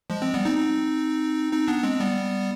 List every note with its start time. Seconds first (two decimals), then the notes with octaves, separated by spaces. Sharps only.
0.10 F3 G#3
0.22 G#3 C4
0.34 G3 B3
0.45 C4 D#4
0.57 C4 D#4
1.53 C4 D#4
1.68 B3 D4
1.84 G#3 C4
2.00 G3 B3